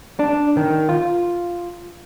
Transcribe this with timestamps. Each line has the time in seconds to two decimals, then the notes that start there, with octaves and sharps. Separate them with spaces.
0.19 D4
0.57 D#3
0.89 F4